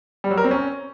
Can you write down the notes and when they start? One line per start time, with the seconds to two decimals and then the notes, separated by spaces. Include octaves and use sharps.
0.24 G3
0.31 F#3
0.37 A#4
0.44 C4
0.51 C#4